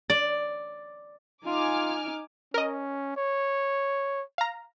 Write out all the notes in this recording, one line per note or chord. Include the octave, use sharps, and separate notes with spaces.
D5
D#4 F4 G#5 D6 F6
C#4 A#4 D#5
C#5
F5 A#5